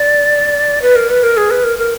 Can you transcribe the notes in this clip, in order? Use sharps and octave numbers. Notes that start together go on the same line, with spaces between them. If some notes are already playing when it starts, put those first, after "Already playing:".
Already playing: D5
B4
A#4
B4
A#4
G#4
B4
A#4
A#4